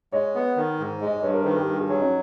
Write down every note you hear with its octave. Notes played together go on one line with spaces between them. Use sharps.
G#3 C#5 D#5
B3
D#3
G#2
G#3
D#5
D5
G2 B4 C#5
A#4 C5
D#3 A4 B4
G4 A4
G2
F#4 G#4
F#3 F#4 G#4
C#4 D#4